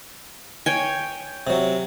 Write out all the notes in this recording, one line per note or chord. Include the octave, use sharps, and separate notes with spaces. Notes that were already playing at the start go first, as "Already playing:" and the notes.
C#5 G5 G#5
C3 F#3